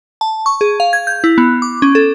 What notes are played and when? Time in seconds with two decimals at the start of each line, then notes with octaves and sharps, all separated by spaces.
0.21 A5
0.46 C#6
0.61 G#4
0.80 F5
0.93 G#6
1.07 G6
1.24 E4
1.38 B3
1.62 D6
1.82 C#4
1.95 A4